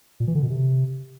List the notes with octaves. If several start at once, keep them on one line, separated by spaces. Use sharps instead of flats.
A#2
E3
D3
B2
C3